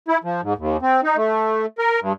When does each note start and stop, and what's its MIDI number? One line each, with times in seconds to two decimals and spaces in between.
0.08 0.18 64
0.24 0.41 53
0.43 0.53 44
0.58 0.77 39
0.82 1.01 60
1.04 1.17 63
1.17 1.66 57
1.78 2.00 70
2.01 2.13 43